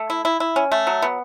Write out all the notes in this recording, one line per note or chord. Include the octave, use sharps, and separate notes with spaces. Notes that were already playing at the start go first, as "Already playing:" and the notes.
Already playing: A3
E4
E4
E4
C#4
A3
F#3
B3